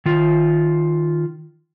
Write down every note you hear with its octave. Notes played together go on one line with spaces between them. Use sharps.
D#3 F4